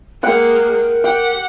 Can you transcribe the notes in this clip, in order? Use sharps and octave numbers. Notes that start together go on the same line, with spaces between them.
G#3 A#3 A#4 F#5 G5
G4 F#5 G5